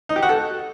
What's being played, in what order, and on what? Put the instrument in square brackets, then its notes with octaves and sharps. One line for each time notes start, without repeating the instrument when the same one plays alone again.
[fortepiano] D#4
G4
F#4
A4